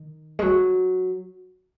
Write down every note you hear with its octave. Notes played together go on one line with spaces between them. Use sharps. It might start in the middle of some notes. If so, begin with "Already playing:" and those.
Already playing: D#3
G#3
F#3